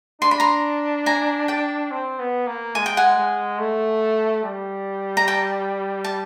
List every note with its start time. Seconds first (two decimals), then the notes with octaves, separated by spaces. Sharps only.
0.22 D4 C6
0.31 B5
0.40 A#5 C6
1.06 G#5 A#5
1.48 G5 A5
1.91 C4
2.19 B3
2.47 A#3
2.75 G#3 G#5
2.86 G5
2.97 F#5 G#5
3.18 G#3
3.59 A3
4.44 G3
5.17 A#5
5.28 G5 A5
6.04 A5